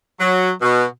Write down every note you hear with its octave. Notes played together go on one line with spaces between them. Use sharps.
F#3
B2